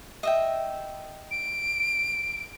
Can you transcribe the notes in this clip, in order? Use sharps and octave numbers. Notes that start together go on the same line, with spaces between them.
D#5 E5 G5
D7